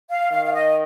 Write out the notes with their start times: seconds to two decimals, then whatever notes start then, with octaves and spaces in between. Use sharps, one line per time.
0.11 F5
0.32 D#3 F5
0.45 F5
0.53 D#5